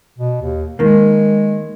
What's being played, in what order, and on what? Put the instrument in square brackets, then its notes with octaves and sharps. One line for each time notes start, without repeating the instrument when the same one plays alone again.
[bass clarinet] B2
D#2
[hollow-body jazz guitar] D#3 A#3 [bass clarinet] G#3